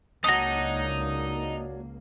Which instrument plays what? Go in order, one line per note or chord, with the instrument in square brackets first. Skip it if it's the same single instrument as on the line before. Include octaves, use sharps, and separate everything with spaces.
[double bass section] C#2 A#3 [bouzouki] F#3 D4 [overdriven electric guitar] D#4 [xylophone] D#6 A#6